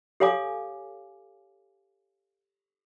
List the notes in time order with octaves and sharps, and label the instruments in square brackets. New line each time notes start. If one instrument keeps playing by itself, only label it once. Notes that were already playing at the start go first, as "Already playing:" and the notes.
[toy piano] G4 A4 C#5 F5 G#5 D6